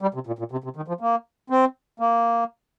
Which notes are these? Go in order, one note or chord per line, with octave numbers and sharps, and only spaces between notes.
G3
C3
A#2
A#2
C3
C3
D#3
F3
A#3
C4
A#3